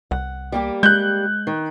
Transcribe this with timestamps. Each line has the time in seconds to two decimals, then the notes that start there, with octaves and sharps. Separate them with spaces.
0.11 C2 F#5
0.52 G3 A#3 G4
0.83 G#3 F#6 G6
1.47 D#3